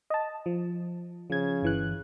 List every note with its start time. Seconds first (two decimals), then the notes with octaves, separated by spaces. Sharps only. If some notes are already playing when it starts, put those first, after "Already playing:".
0.10 D#5 A5
0.46 F3
1.30 C#3 F3 G#6
1.62 G1 E3 F#6